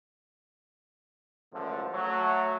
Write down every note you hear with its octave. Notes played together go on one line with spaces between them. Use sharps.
C#2 F#2 A2 D3 E3 F3
F#3 A3